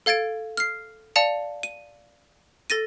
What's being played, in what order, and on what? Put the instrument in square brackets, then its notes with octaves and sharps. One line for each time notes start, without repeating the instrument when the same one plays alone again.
[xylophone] A4 F5 G#6 A6 D7
F6 C7
D5 F5 A5 C#7 F7
D#7
A4 A6 A#6 D#7